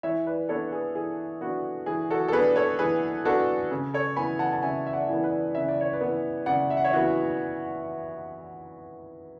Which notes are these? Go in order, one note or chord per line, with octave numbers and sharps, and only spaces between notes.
E3 C#5 E5
B4 D5
B3 D4 A4 C#5
G#4 B4
E3 G#4
B3 D4 F#4
E3 G#4
F#4 A4
A4
B3 D4 G#4 B4
A4 C#5
E3 G#4 B4
B3 D4 F#4 A4
C#3
A4 C#5
E3 B3 G#5 B5
F#5 A5
A5
C#3 E5 G#5
E5
D5 F#5
E3 B3
B4 D5
C#3 E5
D5
C#5
B4 D5
E3 B3
C#3 D5 F#5
E5
F#5
C#5 E5
E3 B3 F#4